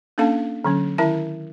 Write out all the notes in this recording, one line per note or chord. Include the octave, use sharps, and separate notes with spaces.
A#3 C#4 D4 A4 F5 A5
D3 F#3 C#4
D#3 E4 A#4 E5 A5